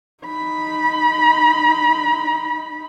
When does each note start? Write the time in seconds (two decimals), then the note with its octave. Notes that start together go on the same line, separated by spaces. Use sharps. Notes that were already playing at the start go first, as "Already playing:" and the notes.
0.24 D#4 B5